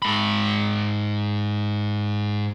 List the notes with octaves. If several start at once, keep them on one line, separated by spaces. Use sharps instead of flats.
G#2 B5